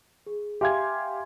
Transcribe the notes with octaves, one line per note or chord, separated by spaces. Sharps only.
G#4
G4 E5 F5 G#5 C6 G#6